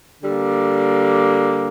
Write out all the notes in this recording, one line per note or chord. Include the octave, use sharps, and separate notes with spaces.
D3 G3 A#3